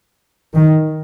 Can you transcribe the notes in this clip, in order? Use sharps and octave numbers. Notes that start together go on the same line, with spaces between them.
D#3